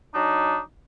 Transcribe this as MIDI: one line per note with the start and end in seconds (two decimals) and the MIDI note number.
0.14 0.58 54
0.14 0.58 62
0.14 0.58 63